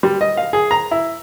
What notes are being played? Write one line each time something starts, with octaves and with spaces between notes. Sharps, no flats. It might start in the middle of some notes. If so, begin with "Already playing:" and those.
G3
D#5
F5
G#4
A#5
E4